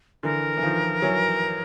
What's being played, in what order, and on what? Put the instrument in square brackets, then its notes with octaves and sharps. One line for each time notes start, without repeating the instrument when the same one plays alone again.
[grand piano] D3 E3 [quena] A#4
[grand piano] E3
D#3 F3
E3 F#3